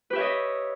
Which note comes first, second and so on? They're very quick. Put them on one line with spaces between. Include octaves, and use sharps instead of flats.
B4 G4 E5 C#5 D#5